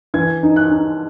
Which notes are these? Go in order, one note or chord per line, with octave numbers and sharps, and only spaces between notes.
E3 G#6
D#4
F#6
D#4